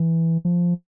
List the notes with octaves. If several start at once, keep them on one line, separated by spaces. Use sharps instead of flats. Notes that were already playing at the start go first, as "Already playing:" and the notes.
Already playing: E3
F3